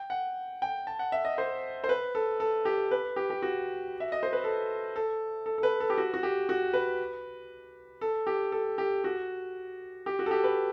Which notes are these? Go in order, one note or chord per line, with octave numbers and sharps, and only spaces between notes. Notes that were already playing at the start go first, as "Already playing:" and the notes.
Already playing: G5
F#5
G5
A5
F#5
E5
D#5
C5
C5
B4
A4
A4
G4
B4
G4
G4
F#4
E5
D#5
C5
B4
A4
A4
A4
A4
B4
A4
G4
F#4
F#4
G4
F#4
B4
A4
G4
A4
G4
F#4
G4
F#4
A4
G4
B4